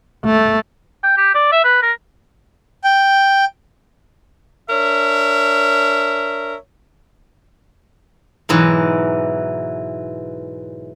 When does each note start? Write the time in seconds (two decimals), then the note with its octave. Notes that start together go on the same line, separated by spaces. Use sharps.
0.25 A3
1.03 G5
1.17 G4
1.35 D5
1.52 E5
1.64 B4
1.83 A#4
2.84 G5
4.69 D4 A#4 C#5 E5
8.49 G#2 B2 E3 F#3